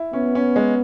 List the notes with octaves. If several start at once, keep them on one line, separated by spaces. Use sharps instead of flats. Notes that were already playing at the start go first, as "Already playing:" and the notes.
Already playing: E4
B3 C#4
C#4
G#3